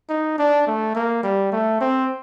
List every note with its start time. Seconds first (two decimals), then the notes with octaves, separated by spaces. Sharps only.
0.10 D#4
0.38 D4
0.67 A3
0.95 A#3
1.24 G3
1.52 A3
1.81 C4